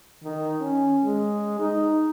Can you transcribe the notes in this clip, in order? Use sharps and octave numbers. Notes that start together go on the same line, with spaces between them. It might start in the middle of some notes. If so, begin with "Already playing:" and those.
D#3
C#4
G#3
D#4